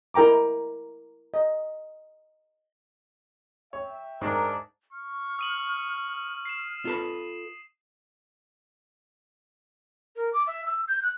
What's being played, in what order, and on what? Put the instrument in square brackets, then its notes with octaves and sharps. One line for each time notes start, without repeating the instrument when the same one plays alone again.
[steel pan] E4 A#4 G5 A#5 D6
D#5
[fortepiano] C#5 [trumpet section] E5 G5
[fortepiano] G#2 [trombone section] D4 A#4
[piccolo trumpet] C#6 [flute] F6
[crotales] D#6 D#7 F#7
C7 E7
[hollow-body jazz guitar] F4 A4 B4
[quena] A#4
D6
E5
E6
G6
F#6